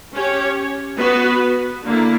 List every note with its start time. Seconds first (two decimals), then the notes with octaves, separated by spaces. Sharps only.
0.13 C#4 G4 C#5
0.98 B3 F#4 B4
1.83 D3 A#3 E4